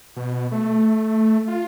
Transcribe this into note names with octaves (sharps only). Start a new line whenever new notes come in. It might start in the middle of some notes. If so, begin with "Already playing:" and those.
B2
A3
F4